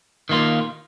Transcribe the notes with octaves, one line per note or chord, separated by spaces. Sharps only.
D#3 A#3 F4